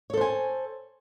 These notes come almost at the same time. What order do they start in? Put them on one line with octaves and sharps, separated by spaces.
C#5 A4 C5 G#5